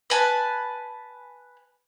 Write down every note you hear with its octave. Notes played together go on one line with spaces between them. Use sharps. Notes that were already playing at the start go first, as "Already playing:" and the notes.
B4 G#5 A5